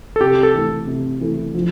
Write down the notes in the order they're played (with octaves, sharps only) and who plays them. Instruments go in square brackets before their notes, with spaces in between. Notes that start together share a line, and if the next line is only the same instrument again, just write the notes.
[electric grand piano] A4
[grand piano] C3 [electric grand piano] G4
[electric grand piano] A4
[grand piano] E3 A3
C3
E3 A3
F3